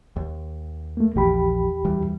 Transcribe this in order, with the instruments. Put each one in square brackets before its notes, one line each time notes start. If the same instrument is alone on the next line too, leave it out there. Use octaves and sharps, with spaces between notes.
[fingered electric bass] D#2
[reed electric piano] A3 A#3
[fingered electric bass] A#1 F3 [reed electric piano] E2 G4 B5
[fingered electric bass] D2 E3 G3